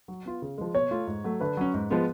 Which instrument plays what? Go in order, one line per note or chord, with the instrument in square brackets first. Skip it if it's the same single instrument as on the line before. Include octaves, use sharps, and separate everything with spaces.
[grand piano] F#3
B3 F4
C#3
F3 G#3
[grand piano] B2 [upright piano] C#5
[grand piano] A3 F4
G#2
F#3 A3
[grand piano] D3 [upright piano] B4
[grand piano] F#3 C#4
G#2
F3 G#3 B3